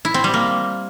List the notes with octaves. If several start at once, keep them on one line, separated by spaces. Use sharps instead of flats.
E4
C4
G3
A#3